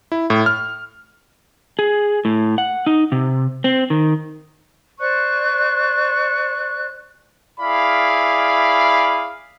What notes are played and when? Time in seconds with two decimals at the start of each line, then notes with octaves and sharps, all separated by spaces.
0.12 E4
0.30 A2
0.46 F6
1.79 G#4
2.25 A2
2.58 F#5
2.86 D#4
3.12 C3
3.64 C4
3.90 D#3
4.99 C5 D5 C#6 F#6
7.59 E4 G#4 D5 F5 B5